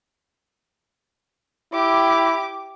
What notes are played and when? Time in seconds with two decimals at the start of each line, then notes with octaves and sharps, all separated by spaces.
1.73 E4 G4 D6